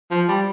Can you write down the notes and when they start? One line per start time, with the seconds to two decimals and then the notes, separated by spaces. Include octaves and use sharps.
0.11 F3
0.28 G3